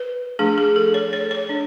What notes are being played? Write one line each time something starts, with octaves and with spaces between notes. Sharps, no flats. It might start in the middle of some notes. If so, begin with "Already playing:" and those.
Already playing: B4
F3 A3 D4 G#4
G#4
A4
C#5
C#5
C#5
D4